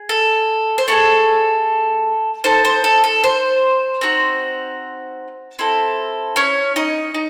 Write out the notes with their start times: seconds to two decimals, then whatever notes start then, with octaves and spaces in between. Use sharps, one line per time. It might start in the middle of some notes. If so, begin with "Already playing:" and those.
Already playing: G#4
0.09 A4
0.78 C5
0.88 A3 D#4 G#4 A4
2.44 D#4 A4 C5
2.65 C5
2.84 A4
3.04 A4
3.24 C5
4.01 C4 D#4 F#4
5.59 C4 E4 A4
6.36 C#4 C#5
6.76 D#4 D#5
7.14 D#4